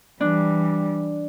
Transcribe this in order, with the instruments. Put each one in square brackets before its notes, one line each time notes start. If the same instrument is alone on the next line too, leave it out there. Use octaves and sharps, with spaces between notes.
[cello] E3 G3 [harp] D4